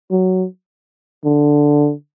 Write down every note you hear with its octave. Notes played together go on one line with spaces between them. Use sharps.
F#3
D3